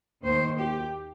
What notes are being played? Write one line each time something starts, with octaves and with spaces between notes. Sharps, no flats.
D#2 D#3 A#3 C5
G4